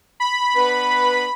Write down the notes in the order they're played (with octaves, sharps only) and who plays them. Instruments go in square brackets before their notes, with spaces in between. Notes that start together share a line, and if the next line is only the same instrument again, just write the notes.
[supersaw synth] B5
[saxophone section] B3 D4 B4